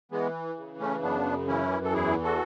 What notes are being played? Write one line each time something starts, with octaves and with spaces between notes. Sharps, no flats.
E3 G#3 B3
C#3
A3 C#4
F#2 B3 D4
E3 C#4 E4
A4
E2 E4 G#4
F#4 A4